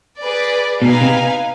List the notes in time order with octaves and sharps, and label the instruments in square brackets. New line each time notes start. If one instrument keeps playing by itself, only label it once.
[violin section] G#4 B4 D5
[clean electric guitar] B2 [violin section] D#4 B4 F5 G#5
[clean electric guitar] C3